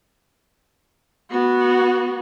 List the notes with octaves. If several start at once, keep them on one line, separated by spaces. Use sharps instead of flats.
B3 F#4